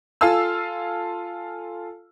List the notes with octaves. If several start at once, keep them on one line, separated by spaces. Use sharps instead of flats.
F4 A4 F5 G#5 E6